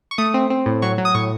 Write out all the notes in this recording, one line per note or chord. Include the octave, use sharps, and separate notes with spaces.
C#6
A3 D#6
C4
C4
A2
F#3 C#6
F#3
D#6
A2 C#6